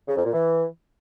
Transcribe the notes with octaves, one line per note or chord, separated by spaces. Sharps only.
C#3
F2
A#2
E3